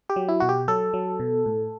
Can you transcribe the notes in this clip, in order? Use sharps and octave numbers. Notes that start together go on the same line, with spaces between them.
G4
F#3
E4
B2 F#4
G4
F#3 A4
F#3
B2
A2